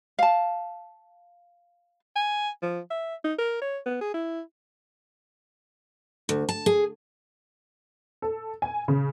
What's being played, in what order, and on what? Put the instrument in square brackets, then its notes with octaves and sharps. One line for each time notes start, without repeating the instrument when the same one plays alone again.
[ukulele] F5 A5
[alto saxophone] G#5
F3
E5
D#4
A#4
C#5
B3
G#4
E4
[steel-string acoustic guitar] D2
A5
G#4
[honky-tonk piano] A4
G#5
C#3